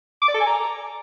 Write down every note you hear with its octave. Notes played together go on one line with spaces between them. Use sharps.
D6
D5
A4
G#5
A#5